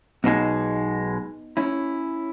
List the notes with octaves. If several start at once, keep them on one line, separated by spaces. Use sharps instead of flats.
B1 B2 G#3 B3 D#4
C#4 E4